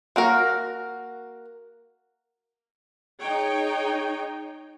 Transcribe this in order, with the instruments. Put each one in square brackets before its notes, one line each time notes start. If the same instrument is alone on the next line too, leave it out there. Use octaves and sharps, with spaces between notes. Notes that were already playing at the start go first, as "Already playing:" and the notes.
[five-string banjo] A#3 F#4 A#4
[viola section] D#4 G#4 C#5 G5